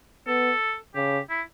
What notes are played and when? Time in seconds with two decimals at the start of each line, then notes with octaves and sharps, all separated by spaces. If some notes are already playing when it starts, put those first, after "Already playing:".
0.27 B3 A4
0.95 C#3 G4
1.29 E4